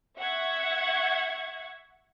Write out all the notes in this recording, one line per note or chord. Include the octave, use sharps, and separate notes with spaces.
E5 F#5 C#6 G#6